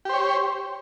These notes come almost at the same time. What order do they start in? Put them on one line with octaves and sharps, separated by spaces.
G4 C5 C#5